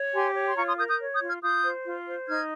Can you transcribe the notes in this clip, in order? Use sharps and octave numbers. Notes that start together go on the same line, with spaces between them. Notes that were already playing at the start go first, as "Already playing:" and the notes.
Already playing: C#5
G4 G#5 C6
C#5
C6
F4 A#5 C#6
C6 D#6
A#4 D#6 G6
D#6 G6
C#5
D#6 G6
F4
F6 G#6
F4 D#6 G6
C5
F4
C5
D#4 F6 G#6